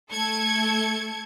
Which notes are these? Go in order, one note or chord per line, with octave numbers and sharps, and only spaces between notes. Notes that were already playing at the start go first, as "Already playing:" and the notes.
A3 A4 G#6 C#7